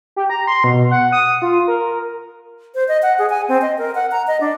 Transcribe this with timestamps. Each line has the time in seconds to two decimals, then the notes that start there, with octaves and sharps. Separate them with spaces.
0.16 G4
0.30 A#5
0.47 C6
0.64 B2
0.91 F#5
1.12 D#6
1.42 F4
1.68 A#4
2.75 C5
2.88 D#5
3.03 F#5
3.19 G#4
3.30 G#5
3.48 C4
3.62 D#5
3.78 A#4
3.95 F#5
4.11 A#5
4.27 D#5
4.41 D4